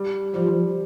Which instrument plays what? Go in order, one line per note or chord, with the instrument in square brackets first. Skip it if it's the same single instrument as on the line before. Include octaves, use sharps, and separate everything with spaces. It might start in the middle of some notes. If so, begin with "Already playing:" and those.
Already playing: [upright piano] G3
[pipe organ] F3 [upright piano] G3